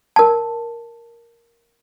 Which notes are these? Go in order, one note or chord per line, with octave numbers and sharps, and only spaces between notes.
A#4 A5